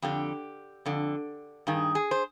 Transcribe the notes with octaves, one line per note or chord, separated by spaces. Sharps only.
F2 D3 G4
F2 D3
G2 D#3 G#4
G#4
C5